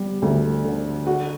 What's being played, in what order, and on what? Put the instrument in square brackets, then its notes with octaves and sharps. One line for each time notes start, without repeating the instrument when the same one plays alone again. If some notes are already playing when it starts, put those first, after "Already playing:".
Already playing: [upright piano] G3 B3
D2
D3
F#4